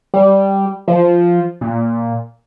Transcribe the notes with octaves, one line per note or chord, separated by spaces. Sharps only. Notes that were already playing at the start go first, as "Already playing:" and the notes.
G3
F3
A#2